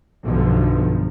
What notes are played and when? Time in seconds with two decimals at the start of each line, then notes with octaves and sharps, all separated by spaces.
0.25 B1 G2 D3 F3